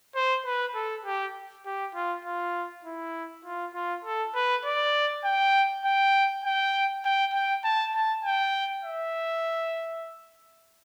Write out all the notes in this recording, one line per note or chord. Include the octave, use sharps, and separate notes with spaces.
C5
B4
A4
G4
G4
F4
F4
E4
F4
F4
A4
B4
D5
G5
G5
G5
G5
G5
A5
A5
G5
E5